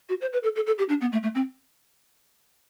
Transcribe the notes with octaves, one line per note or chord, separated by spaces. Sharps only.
F#4
C5
B4
A4
A4
A4
G4
D4
B3
A3
A3
C4